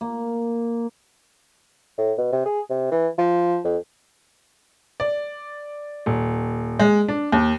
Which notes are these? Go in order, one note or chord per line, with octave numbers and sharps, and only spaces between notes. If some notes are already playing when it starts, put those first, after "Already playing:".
A#3
A2
B2
C3
G#4
C3
E3
F3
F2
D5
D#1
G#3
D4
D#2